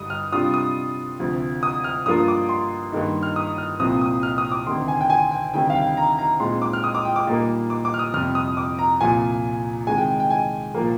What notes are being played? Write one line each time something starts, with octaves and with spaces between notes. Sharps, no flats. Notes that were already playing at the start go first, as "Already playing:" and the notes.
Already playing: G2 D3 G3 D4 D#6
F6
C3 G3 D4 F4 D#6
D#6
D2 C3 F3
D#6
F6
G2 F3 A#3 D4 F4 D#6
D6
C6
G2 D#3 A#3 D#4
F6
D#6
F6
C2 A#2 F3 C4 D#6
D#6
F6
D#6
D6
D2 C3 D#3 C6
G#5
G5
G#5
G5
D2 C3 D#3 G3 G5
F5
G5
A#5
A#5
A#2 G#3 C4 D#4 C6
D6
F6
D#6
D6
G5
D6
A#2 G3 A#3 D#4
D6
D6
F6
D#6
F2 C3 G3 F6
D#6
D6
A#5
C2 A#2 F3 G#5
C3 D#3 G#3 G#5
G5
G5
G#5
A#2 F3 A#3